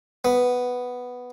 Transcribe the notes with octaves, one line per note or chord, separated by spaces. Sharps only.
B3